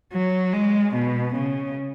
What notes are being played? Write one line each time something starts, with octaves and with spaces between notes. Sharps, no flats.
F#3
G#3
B2
C#3